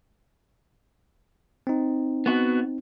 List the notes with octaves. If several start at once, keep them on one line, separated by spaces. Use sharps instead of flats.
C4 D#4
B3 F#4